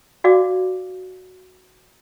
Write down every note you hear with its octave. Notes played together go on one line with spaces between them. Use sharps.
F#4 D5 F5 D6